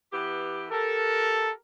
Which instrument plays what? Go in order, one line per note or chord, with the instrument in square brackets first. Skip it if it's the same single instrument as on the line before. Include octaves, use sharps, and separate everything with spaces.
[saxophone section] E3 B3 G4
[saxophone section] G4 A#4 [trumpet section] A4